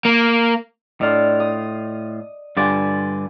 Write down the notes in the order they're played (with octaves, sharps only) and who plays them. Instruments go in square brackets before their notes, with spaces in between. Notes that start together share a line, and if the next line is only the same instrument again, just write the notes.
[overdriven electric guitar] A#3
[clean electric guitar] A2 F4 [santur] D4 D5 D#5
[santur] D#6
[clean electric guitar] G2 D3 D5 [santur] F4 G4 G#5